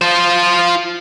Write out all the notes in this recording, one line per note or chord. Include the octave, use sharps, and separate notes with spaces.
F4 C5